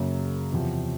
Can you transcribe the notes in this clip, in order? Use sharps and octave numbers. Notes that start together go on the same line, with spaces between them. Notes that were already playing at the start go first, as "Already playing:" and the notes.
Already playing: F#2 C#3 F#3 A#3
E2 C3 F3